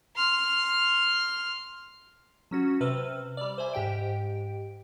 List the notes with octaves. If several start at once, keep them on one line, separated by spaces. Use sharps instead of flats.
C6 F6
F#3 C#4 F#4
C3 B4 C5 E6 F6
G3 D5
C5 D5 E5 G#5
G#2 G4 G5 D7